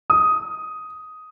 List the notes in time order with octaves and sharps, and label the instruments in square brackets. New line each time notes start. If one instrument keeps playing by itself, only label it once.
[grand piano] D#6